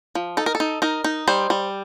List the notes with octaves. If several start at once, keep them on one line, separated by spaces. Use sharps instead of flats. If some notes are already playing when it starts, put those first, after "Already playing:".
F3
D#4 A4
A#4
A4
D#4
D#4 A#4
D#4
G3 C5
G3